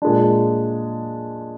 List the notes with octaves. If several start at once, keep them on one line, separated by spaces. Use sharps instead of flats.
A#2 G#3 D4